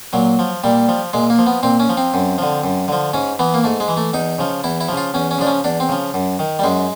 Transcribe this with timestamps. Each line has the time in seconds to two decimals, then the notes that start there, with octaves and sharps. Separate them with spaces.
0.13 A#2 F#3
0.39 F3
0.64 A#2 G3
0.89 F3
1.13 A#2 G#3
1.30 A#3
1.38 F3
1.47 B3
1.63 A#2 C4
1.80 C#4
1.89 F3
1.97 C4
2.14 F#2
2.38 D3 F3
2.64 F#2
2.88 D3 F3
3.13 G#2 C#4
3.39 E3 B3
3.54 A#3
3.64 G#2 A3
3.80 G#3
3.88 E3
3.97 A3
4.13 E2 D#4
4.38 C#3 F3
4.64 E2 E4
4.80 E4
4.88 C#3 F3
4.97 F4
5.14 E2 C#4
5.31 C#4
5.38 C#3 F3 D4
5.47 C#4
5.64 E2 D4
5.80 C4
5.89 C#3 F3
6.14 F#2
6.39 D#3
6.59 G3
6.64 F#2 G#3